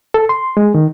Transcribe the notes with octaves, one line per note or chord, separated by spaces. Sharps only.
A4
C6
G#3
D#3